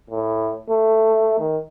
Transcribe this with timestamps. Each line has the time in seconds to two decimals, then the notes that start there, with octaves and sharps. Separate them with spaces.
0.10 A2
0.70 A3
1.40 D#3